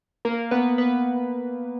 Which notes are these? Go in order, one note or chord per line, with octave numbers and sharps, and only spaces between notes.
A#3 A#4
B3 B4
B3 B4